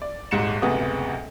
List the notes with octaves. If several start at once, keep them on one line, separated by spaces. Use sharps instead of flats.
D5
D#1 G#1 G#2 C#7 E7
F#1 D2 G#2 C3 B3 D#6